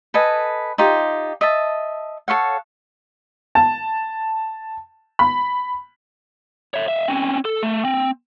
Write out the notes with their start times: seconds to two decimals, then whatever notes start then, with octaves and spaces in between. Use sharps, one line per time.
0.14 A4 B4 D#5 G#5
0.78 D#4 F4 G4
1.41 D#5 E5 A5
2.28 A4 C#5 F5 F#5
3.55 A5
5.19 B5
6.74 C#5 E5
6.88 E5 F5
7.08 C4 C#4
7.45 A4
7.62 A3
7.85 C4